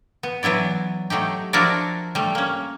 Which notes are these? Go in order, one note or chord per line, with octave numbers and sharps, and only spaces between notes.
B3
E3 F#3 B3 E4 D5
F#3 A3 D#4 G4
F3 D4 E4 F#4 A#4 D5
G3 A3
A#3 C#4